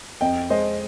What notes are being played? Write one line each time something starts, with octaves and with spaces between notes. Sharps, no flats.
F2 D#5 G5
G#3 C5 D#5